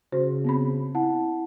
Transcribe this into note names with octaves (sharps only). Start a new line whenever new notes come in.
C#3 F#4 C5
B3 C4 B5
E4 F#5 A5